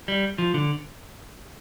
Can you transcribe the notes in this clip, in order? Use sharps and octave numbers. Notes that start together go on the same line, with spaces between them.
G3
F3
D3